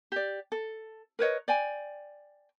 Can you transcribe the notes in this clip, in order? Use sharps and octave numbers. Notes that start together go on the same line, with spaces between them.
G4 D5
A4
A#4 B4 C#5 D#5
D5 G5 G#5